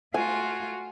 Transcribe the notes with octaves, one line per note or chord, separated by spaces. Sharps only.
A3 F4 F#4 G#5